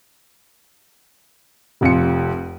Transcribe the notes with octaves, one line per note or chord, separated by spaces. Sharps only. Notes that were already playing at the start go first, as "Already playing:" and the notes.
F1 F2 F4 C#7